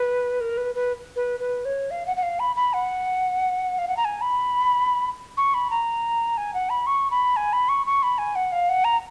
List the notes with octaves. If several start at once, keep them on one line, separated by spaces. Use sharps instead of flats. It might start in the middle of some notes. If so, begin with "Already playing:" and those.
Already playing: B4
A#4
B4
B4
B4
B4
C#5
F5
F#5
F#5
F5
B5
B5
F#5
F5
F#5
A#5
G#5
B5
C#6
B5
A#5
G#5
F#5
B5
C#6
B5
G#5
B5
C#6
C#6
B5
G#5
F#5
F5
F#5
A#5